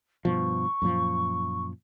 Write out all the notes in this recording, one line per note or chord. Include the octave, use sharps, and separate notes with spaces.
G2 B2 F3 C#6
F#2 A#2 F3